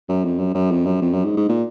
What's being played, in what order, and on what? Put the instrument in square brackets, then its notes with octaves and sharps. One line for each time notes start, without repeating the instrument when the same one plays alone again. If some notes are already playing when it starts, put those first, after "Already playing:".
[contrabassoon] F#2
F2
F#2
F#2
F2
F#2
F2
F#2
G#2
G#2
A#2